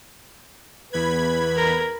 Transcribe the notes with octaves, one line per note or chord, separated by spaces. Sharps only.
E2 B4 B5 G#6
A#4